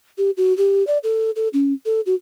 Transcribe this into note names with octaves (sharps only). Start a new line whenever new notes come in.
G4
F#4
G4
D5
A4
A4
C#4
A4
F#4